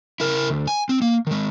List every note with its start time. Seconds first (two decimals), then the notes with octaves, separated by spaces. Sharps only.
0.20 E4 A#4
0.50 D2
0.68 G#5
0.89 C4
1.02 A#3
1.27 D#3 G#3